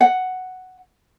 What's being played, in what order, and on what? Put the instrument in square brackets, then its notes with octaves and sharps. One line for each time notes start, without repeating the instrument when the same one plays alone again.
[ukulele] F#5